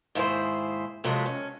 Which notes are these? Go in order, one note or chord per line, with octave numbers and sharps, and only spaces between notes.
D#2 G#2 E4 G#4 C5
F2 C3 F#3 G#3 A3
C#4